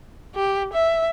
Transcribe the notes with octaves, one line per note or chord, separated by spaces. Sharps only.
G4
E5